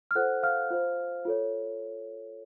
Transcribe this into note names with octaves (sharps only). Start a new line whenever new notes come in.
F6
F4 A4 C5 F#5 F#6
F5 F6
F4 C5
F4 A4 C#5